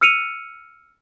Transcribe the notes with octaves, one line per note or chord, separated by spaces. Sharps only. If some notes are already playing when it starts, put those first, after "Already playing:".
E6 F6 C#7 D#7 F7